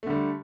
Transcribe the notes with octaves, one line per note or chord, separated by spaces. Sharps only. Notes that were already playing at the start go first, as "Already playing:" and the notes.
D3 G3 A3